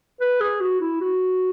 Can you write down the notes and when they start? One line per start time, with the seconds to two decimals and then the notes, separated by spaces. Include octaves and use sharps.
0.20 B4
0.40 G#4
0.61 F#4
0.81 E4
1.01 F#4